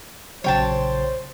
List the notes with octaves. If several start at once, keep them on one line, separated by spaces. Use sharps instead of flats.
A#1 C#3 F#3 C5 C#5 G5 A5